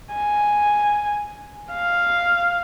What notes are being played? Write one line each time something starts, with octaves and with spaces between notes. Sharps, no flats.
G#5
F5